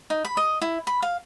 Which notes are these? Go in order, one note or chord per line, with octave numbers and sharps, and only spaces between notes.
D#4
B5
D#5
E4
B5
F5